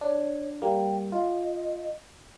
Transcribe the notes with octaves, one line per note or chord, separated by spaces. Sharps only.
D4 C#5
G3 A#3 G5
F4 D#5